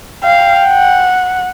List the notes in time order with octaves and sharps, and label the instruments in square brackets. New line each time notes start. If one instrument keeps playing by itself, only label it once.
[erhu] F5 [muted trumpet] G5
[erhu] F#5